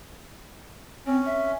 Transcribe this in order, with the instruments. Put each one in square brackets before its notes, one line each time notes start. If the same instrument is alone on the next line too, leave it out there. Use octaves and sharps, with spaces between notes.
[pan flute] C4 [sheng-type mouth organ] C#4
[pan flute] E5